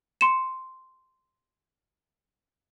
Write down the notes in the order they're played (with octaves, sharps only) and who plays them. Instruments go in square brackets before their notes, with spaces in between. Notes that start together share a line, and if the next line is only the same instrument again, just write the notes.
[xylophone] C6 C#7 E7